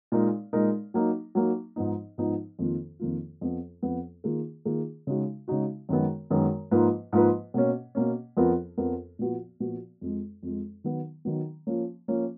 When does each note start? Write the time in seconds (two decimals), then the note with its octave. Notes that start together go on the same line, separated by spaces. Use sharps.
0.12 A#2 G#3 D#4 A#4
0.53 A#2 G#3 D#4 A#4
0.94 F#3 A#3 D#4
1.35 F#3 A#3 D#4
1.76 G#2 F3 B3 D#4
2.18 G#2 F3 B3 D#4
2.59 F2 D#3 A#3 F4
2.99 F2 D#3 A#3 F4
3.41 F2 F3 B3
3.83 F2 F3 B3
4.24 D#3 A#3 F4 G#4
4.65 D#3 A#3 F4 G#4
5.07 C#3 G#3 D#4 F#4
5.48 C#3 G#3 D#4 F#4
5.89 F#2 D#3 G#3 B3
6.30 F#2 D#3 G#3 B3
6.71 G#2 F3 A#3 F4 B4
7.13 G#2 F3 A#3 F4 B4
7.54 B2 A#3 C#4
7.95 B2 A#3 C#4
8.37 F2 F3 B3 F4 A#4
8.78 F2 F3 B3 F4 A#4
9.19 A#2 F3 B3 F#4
9.60 A#2 F3 B3 F#4
10.01 F2 F3 G#3
10.43 F2 F3 G#3
10.84 D#3 F#3 B3
11.25 D#3 F#3 B3
11.67 F3 A#3 C#4
12.08 F3 A#3 C#4